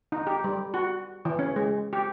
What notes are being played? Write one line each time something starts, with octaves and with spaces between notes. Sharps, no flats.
D#4
G4
G3
F#4
E3
C#4
G#3
G4